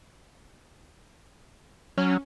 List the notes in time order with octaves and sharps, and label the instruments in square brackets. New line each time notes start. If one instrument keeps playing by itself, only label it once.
[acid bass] F#3 [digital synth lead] C#4